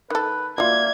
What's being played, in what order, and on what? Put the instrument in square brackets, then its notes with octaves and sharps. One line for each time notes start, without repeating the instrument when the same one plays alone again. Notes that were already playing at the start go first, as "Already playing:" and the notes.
[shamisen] D#3 A4 [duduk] B4
[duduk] A#3 [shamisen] F4 F#4 [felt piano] D5 E5 [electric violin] G#6